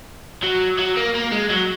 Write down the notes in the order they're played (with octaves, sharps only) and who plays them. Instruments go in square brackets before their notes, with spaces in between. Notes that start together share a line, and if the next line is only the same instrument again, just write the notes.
[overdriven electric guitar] F#3
F#3
A#3
A#3
G#3
F#3